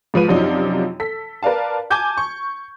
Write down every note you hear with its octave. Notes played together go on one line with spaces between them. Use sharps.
G#2 F3 B4 D#7
F#2 C3 F3 F#3 D4 D#4
A4 B6
A#4 B4 D5 F5 A5
G#5 A5 D6 G6 G#6
C#6